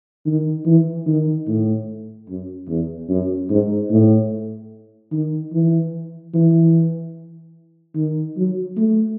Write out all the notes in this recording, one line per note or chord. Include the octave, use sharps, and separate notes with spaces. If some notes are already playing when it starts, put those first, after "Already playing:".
D#3
E3
D#3
A2
F#2
E2
F#2
G#2
A2
D#3
E3
E3
D#3
F#3
A3